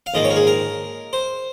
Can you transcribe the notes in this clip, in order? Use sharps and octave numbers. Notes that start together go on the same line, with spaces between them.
F5
A#1 G#2 D#3 A#3 D#5
C#5
A#4
G#4
A#4
C5